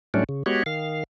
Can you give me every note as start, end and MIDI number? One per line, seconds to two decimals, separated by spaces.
0.14 0.24 45
0.14 0.24 54
0.14 0.24 55
0.14 0.24 57
0.14 0.24 61
0.14 0.24 62
0.29 0.43 49
0.46 0.63 56
0.46 0.63 59
0.46 0.63 66
0.46 0.63 67
0.46 0.63 73
0.66 1.04 51
0.66 1.04 77